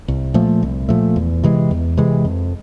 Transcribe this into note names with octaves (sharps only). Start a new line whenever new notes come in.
C2
A#2 F3 A3
C2
A#2 F3 A3
E2
C3 E3 G#3
E2
C3 E3 G#3
F2